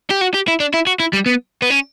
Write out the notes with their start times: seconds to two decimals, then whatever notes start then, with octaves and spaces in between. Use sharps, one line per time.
0.10 G4
0.21 F#4
0.34 G4
0.48 E4
0.60 D4
0.74 E4
0.87 F#4
1.00 E4
1.13 G3
1.26 B3
1.62 B3
1.70 C#4